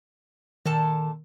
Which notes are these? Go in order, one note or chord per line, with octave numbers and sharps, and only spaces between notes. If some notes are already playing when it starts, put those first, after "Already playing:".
A#2 D#3 A4 A5